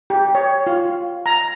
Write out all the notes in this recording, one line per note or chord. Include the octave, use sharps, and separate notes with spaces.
G4
C#5
F4
A#5